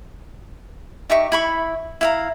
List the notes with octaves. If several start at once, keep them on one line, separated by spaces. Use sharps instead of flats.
D#4 G4 E5 C#6
E4 B5 C#6
E4 F5 A#5